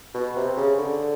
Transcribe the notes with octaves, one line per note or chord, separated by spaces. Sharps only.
B2
C3
C#3
D3